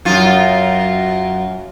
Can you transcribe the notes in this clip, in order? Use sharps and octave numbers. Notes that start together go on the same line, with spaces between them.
F#2 F4